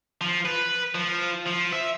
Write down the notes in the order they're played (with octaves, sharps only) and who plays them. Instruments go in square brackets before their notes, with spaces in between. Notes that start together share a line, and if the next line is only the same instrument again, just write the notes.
[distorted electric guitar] F3
B4
F3
F3
E5